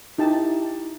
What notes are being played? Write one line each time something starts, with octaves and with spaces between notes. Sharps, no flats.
D#4 E4 G4 A5